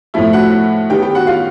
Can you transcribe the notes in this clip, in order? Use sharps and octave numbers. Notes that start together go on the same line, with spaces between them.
A2 F3 A3 E4 E5
F#4 F#5
D#3 G3 B3 G4 G5
G4 G5
F#4 F#5
F4 F5